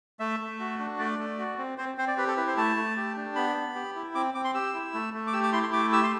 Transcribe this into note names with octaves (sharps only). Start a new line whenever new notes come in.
A3 E5
A3
F#4
D4
A3 D5
A3
F#4
C4
C4 C5
C4 C5
D5
G4 B4
A4
E4 B4
C5
A3 A5
A3
G4
D4
B3 B5
B3
G4
E4
C4 D6
C4 D6
C6
G4 E6
E4
A3
A3
D6
G4 E6
D6
E4 C6
C6
A3 D6
G4 E6
C6